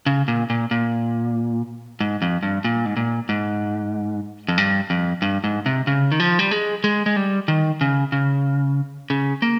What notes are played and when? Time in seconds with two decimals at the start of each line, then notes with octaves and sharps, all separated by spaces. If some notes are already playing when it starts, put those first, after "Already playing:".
0.06 C#3
0.28 A#2
0.50 A#2
0.71 A#2
2.01 G#2
2.22 F2
2.43 G2
2.65 A#2
2.86 G#2
2.97 A#2
3.29 G#2
4.48 F2
4.58 G2
4.90 F2
5.22 G2
5.44 G#2
5.66 C3
5.87 C#3
6.12 D#3
6.20 F3
6.39 G3
6.51 G#3
6.84 G#3
7.06 G#3
7.16 G3
7.48 D#3
7.81 C#3
8.12 C#3
9.10 C#3
9.42 A#3